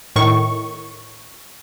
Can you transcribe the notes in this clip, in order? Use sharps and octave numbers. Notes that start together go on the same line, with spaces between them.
A2 D#3 C#6